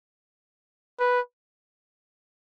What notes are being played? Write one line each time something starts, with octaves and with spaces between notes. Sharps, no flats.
B4